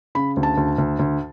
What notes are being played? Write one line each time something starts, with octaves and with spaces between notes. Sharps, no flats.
C#3 B5
D2
A5
D2
D2
D2